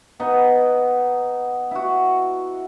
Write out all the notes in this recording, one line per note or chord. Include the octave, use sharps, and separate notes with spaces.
B3 D#4 D#5 F#5
E4 F#4